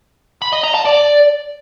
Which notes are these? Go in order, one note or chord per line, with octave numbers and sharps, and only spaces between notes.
B5
D#5
A#5
A5
D5